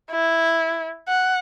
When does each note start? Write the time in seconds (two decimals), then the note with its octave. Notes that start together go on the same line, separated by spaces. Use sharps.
0.11 E4
1.08 F#5